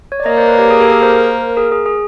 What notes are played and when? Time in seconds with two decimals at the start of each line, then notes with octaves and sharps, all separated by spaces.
0.12 C#5
0.20 D5
0.26 A#3 C#5 D#5
0.37 C5 D5
0.48 B4 C#5
0.59 G4
0.70 G#4
0.80 G4 A4
0.91 G#4 A#4
1.02 A#4 C5
1.57 G#4 A#4
1.72 G#4
1.86 G#4